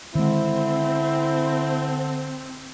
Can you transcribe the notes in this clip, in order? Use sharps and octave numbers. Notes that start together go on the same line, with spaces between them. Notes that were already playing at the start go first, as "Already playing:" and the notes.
D3 D#3 G#3 C4 E4